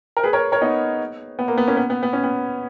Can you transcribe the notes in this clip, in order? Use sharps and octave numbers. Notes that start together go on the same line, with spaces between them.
A#4
G#4 B4
A#4 C#5
A#4 C#5
B3 D#4
B3
A#3
B3
A#3 C#4
B3
B3
B3
C#4
B3